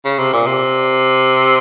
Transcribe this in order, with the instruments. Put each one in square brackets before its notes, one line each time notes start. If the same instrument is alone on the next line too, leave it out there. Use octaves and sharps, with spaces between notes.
[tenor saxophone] C#3
C3
A#2
C3